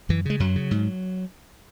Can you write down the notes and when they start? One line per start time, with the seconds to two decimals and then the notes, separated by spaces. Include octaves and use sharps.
0.09 F#2 E3
0.25 C#3 G#3
0.40 F#2 F#3
0.56 C#3
0.71 G#2